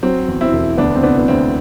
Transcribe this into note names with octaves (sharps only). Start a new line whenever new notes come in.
F#3 C4
E2
C4 E4
E1
D2 B3 D4
C4
C3 B3 D4
B3
D2 C4